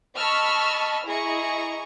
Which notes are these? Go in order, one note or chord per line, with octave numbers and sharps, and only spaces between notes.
D#5 A5 B5 C#6 E6 F6
E4 G#4 D#5 A#5 C#6